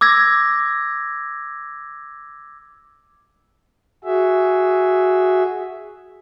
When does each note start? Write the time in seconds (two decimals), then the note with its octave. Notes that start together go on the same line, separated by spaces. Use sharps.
0.01 D6 E6 G#6 A#6
4.04 F#4 G#4 E5